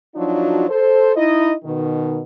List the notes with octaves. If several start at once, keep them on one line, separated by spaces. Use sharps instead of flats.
F3 F#3 D4 D#4 F4 F#4
A4 C5
D#4 E4 D#5
B2 D#3